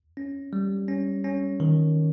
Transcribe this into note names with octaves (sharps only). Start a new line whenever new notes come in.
C#4
G3
C#4
C#4
D#3